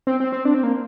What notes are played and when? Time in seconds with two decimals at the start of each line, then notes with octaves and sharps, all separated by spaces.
0.07 C4
0.20 C4
0.32 C4
0.45 D4
0.54 C4
0.63 A#3